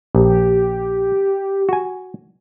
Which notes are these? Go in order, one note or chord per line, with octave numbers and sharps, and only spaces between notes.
A#1 G4
F#4 G#5